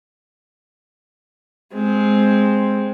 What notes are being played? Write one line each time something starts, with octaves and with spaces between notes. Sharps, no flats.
G#3 C4